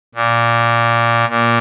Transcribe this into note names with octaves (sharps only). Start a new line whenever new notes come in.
A#2
A#2